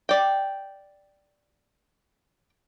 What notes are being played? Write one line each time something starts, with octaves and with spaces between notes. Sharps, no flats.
D5 G5